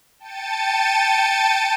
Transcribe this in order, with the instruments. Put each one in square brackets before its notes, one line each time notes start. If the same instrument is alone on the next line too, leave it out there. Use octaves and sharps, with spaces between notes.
[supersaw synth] G5 A5 A6 C#7 D#7